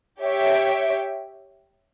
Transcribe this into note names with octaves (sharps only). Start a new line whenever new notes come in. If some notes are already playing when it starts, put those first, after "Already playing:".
G4 C#5 E5 G5